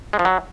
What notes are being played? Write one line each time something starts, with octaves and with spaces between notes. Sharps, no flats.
G#3
F3
F#3